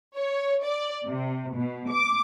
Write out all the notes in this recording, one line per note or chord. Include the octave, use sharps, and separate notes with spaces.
C#5
D5
C3
B2
D6